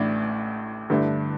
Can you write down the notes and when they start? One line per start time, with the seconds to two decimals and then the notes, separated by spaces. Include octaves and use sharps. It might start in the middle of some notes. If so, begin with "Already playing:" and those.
Already playing: A1 A2 A3 D4
0.90 G2 D3 A3